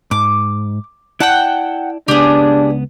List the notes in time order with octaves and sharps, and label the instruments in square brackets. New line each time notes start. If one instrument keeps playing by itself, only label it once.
[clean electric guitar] G#2 [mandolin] D6
[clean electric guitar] E4 D5 A5 [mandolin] F#5 G5
[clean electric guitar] C#2 B3 [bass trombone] D4 [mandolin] G4 G#4